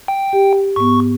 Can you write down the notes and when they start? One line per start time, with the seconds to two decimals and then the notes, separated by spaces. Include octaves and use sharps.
0.08 G5
0.33 G4
0.76 G#2 B3 C#6